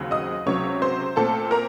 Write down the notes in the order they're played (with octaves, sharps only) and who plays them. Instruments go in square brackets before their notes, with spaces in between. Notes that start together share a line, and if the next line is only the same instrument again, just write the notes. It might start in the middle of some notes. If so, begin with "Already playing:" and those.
Already playing: [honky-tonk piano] D#2 C#3 F#3 C4
D#5 D#6
C#2 C3 F#3 C#5 C#6
C5 C6
A#2 A3 C4 A4 A5
A#4 A#5